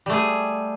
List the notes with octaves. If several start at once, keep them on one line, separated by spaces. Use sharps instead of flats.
G3 A3 G#4